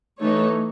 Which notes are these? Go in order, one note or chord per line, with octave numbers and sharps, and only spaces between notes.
E3 A3 D#4 A4 C#5